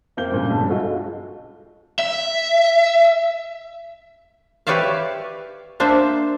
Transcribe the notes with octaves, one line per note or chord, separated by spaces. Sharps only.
F1 A#3 C4 G6 G7
G2 A#2 C#3
B1 G2
G#3 D#4 F4 F#4 A4
E5
G4 B4 C#5 D5 E5 F5
A#3 D4 C5 E5